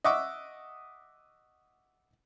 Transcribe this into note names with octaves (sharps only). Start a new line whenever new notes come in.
D#5 E5 F#5 C#6 D6 E6